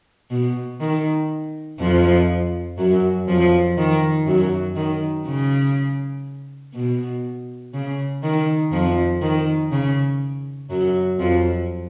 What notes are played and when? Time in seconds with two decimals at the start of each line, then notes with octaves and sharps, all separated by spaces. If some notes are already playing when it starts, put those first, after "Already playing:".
0.30 B2
0.80 D#3
1.79 F2 F3
2.78 F#2 F#3
3.28 F2 F3
3.77 D#3
4.27 F#2 F#3
4.76 D#3
5.26 C#3
6.74 B2
7.74 C#3
8.23 D#3
8.72 F2 F3
9.22 D#3
9.71 C#3
10.70 F#2 F#3
11.19 F2 F3